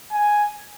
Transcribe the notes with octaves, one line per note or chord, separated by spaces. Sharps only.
G#5